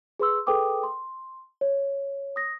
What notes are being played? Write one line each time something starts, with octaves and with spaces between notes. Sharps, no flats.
G#4 B4 C6 E6
G#4 A4 B4 G5 D6 D#6
C6
C#5
D#6 A#6